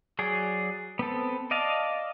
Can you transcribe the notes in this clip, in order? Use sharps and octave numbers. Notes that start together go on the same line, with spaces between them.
F#3 G#4 D5
B3 C4 A4
D5 D#5 F5 A5